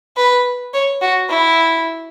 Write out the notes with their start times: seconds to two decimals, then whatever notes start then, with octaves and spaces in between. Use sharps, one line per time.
0.17 B4
0.74 C#5
1.02 F#4
1.29 E4